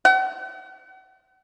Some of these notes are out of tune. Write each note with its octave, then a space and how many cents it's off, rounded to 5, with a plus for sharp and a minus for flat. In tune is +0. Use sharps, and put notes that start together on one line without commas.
F#5 +40